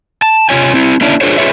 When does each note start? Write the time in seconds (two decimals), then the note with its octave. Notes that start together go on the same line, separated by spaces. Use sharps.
0.22 A5
0.49 C3 F4 C#5 G#5
0.74 C4 E4
1.01 A#3 C#4 D4 E4
1.21 D4 F4 G#4 A#4 C5 C#5
1.38 F4 G#4 B4 C#5 E5